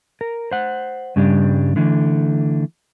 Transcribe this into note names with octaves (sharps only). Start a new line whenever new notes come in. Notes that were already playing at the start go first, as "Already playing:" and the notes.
A#4
C5 F#5
G2 C#3 G3 D4
D3 E3 A3